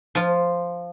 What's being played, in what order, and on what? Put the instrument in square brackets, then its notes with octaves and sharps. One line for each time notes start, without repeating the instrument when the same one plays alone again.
[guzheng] F3 F4